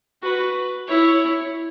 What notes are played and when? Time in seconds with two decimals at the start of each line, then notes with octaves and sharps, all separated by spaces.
0.23 F#4 B4
0.87 E4 C#5